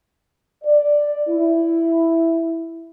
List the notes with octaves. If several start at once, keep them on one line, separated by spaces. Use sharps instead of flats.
D5
E4